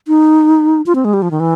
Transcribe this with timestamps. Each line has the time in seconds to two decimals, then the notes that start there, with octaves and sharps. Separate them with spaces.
0.08 D#4
0.86 F4
0.95 C4
1.05 G#3
1.14 G3
1.22 F3
1.31 D#3
1.40 E3